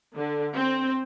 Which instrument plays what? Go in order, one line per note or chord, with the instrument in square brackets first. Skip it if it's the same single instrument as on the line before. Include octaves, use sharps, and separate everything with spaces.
[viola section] D3
C4